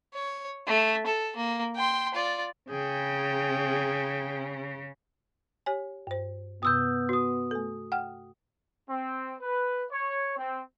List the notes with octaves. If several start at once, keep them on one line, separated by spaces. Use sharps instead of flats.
C#5
A3
A4
A#3
G5 C6
F4 D5
C#3 G#4 G5
G4 C#5 G#5
G2 C5
G2 C3 B3 D#6 E6 G6
F#4 D#6
A3 A4
F#5 G5 F6
C4
B4
C#5
C4